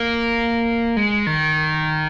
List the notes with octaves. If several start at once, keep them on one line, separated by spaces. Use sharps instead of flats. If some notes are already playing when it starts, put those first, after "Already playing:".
Already playing: A#3
G#3
D#3